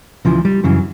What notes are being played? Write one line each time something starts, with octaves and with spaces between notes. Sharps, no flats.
C#2 C#3 E3 F3
G3
F#2 C#3 E3 F#3